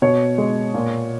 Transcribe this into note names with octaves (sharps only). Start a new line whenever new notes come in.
B2 C#5
G#3
A#2